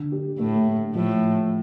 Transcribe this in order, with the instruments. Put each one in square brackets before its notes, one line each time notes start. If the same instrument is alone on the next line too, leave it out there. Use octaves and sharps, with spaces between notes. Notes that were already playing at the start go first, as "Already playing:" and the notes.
Already playing: [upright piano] D3
G4
[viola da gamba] A2 [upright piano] A3
[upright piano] A3
[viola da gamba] A2 [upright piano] F3